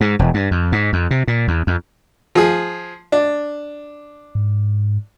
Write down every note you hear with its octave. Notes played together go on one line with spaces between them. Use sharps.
G#2
E1
G2
F2
G#2
F2
C3
A#2
E2
F2
F3 G#4
D4
G#2